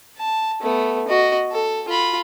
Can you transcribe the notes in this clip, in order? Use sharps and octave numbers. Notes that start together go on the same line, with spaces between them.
A5
A3 B3
F#4 D#5
A4
F4 B5